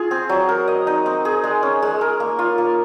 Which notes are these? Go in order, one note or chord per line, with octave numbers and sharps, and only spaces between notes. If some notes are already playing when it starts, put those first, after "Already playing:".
Already playing: F4 G#4
C4
F#3
A#4
D#5
D#4
C4
G#4
G#3
C#4
G#3
A#4
A#3
F4
A#3